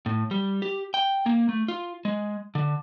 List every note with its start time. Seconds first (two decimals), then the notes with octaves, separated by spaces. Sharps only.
0.06 A2
0.31 G3
0.62 G4
0.94 G5
1.26 A#3
1.49 A3
1.68 F4
2.05 G#3
2.55 D3